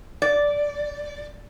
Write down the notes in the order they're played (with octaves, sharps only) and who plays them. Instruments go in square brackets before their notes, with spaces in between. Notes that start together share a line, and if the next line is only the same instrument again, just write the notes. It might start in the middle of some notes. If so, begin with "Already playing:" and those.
[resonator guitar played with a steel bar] D5